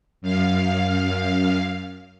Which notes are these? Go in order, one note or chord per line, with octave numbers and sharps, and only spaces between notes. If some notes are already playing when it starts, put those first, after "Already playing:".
F#2 F5